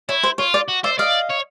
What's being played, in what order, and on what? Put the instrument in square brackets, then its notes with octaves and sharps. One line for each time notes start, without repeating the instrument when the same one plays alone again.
[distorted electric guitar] E4 [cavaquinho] C#5
[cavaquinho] C5
[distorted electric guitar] F4 [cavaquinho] C#5
[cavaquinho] D5
[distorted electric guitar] F#4
[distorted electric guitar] C5 [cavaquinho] D5 E5
[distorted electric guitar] D5 [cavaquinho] D#5 F5
[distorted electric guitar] C#5